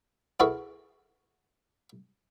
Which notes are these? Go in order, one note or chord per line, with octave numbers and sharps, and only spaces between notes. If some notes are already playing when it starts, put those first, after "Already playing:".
E4 F#4 G#4 A4 B4 F5